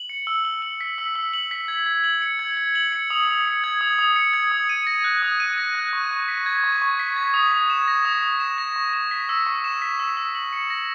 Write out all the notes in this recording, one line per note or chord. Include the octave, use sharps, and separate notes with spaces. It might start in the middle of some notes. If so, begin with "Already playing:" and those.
Already playing: F#7
C#7
E6
E6
F#7
B6
E6
E6
F#7
B6
G#6
G#6
F#7
C#7
G#6
G#6
F#7
C#7
D#6
D#6
C#7
G#6
D#6
D#6
C#7
G#6
D#6
D#7
A#6
F#6
D#6
D#7
A#6
F#6
C#6
C#6
B6
G#6
C#6
C#6
B6
G#6
D#6
D#6
E7
A#6
D#6
D#6
E7
A#6
C#6
E7
B6
E6
C#6
E7
B6
E6
E6
F#7
C#7
A#6